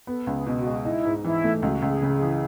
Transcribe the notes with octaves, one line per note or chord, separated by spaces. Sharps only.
B3 A4
C#2
G#4
B2
F#4
G#3
D#4 E4
G#2
E3 E4
A3
C#2 F#4
C#2
G#4
C#3
G#4
E3